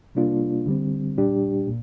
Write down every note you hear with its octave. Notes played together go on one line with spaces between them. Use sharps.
C3 G3 A#3 D4 F4
D3 G3 C4
A#2 G3 D4 G4
A#2